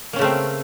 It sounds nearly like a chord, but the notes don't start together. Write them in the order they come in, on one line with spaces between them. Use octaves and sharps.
A#3 C#4 C#3 A3 C4